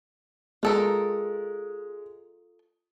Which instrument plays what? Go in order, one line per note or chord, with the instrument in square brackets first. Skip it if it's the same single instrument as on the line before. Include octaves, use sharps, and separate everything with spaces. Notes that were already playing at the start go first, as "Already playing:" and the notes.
[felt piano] G#3 [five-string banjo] F4 A4 A#4